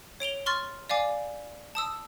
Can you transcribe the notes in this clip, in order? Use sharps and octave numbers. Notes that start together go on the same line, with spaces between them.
C#5 D7 F7 G7
C6 C#6 F6 A6
D5 F5 G#5 D6
A5 D#6 E6